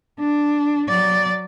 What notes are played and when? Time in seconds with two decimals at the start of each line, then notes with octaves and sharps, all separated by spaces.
0.19 D4
0.89 F#3 D5